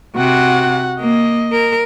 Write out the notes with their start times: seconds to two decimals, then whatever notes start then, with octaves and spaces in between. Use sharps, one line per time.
0.16 C3 F#4 F#5
1.00 A#3 D#5
1.52 A#4